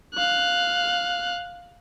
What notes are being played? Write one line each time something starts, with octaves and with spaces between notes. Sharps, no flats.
F5 F#6